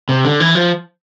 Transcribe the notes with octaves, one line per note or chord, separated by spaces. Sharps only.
C3
D3
E3
F3